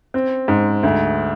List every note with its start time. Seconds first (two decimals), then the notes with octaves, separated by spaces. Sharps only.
0.14 C4
0.48 G#2
0.83 D2